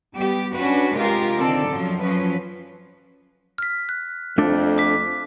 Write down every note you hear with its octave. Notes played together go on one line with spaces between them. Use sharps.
G3 B3 G4
C#4 D4 F#4 B4
C3 G#3 F4 G4 A#4
D3 D#3 C4 A4 D5
F#2 F3 F#3
F3 F#3 C#4 B4
F6 B6
F#6
F2 A3 D4 A4
D6 B6